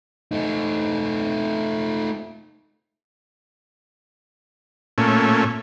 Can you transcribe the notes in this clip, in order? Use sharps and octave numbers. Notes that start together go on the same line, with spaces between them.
A3 D#4
A#2 A3 C#4